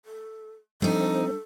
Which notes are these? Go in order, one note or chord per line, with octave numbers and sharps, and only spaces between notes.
A4
F3 G3 C4 D4 D#4 A4